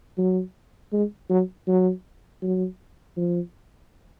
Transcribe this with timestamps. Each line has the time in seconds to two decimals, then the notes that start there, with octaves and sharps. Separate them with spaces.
0.18 F#3
0.93 G#3
1.30 F#3
1.68 F#3
2.42 F#3
3.17 F3